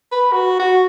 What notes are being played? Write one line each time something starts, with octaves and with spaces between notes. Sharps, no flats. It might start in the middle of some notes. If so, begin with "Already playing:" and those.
B4
F#4
F#4